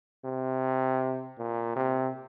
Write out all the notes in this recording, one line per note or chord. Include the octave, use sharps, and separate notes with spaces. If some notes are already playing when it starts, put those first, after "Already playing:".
C3
A#2
C3